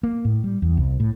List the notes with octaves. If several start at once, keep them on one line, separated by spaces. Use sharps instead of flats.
A#3
A2
G3
E2
C2
A2